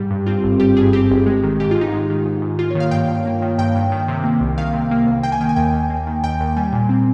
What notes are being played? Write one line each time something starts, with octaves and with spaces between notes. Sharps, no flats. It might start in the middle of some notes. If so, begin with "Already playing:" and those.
Already playing: G#2 G3 G4
G2
C4 F4
G1
G3 G4
G2 G#4
C4 G4
G1
G#3
D#3
G#2 G4
G#2 F4
D#4
G#3 D#4
D#3
G#2
G#2
A#3 F4
D#3 C#5
F5
G2 G5
G2
A#3
D#3
G2 G5
G2
D#3
C3
A#3
C2
D#3 F5
C3
A#3
C2
A#3 G5
G#5
D#3 G5
G#5
D#2 G5
D#2
A#3
D#3
D#2 G5
D#2
G3 G#5
A#2
C4